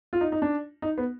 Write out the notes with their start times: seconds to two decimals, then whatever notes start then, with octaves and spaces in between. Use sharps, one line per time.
0.13 F4
0.21 D#4
0.32 D#4
0.42 D4
0.82 D#4
0.98 B3